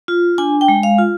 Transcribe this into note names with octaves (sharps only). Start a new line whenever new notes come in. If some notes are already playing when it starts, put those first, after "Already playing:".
F4
D4 G#5
G5
G#3
F5
F4